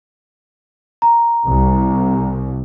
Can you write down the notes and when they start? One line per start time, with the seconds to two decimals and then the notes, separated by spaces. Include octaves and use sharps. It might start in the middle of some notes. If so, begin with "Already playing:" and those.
1.02 A#5
1.47 C2